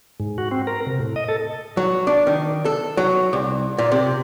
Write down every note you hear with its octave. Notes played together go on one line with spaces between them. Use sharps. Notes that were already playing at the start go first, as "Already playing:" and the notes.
G#2
F#4
C4
A#4
C3
A2
D#5
A4
F#3
D4
D#3
A4
F#3
C2
A#2
C3